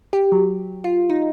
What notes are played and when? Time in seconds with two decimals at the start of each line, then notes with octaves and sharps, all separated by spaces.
0.13 G4
0.32 F#3
0.84 F4
1.10 D#4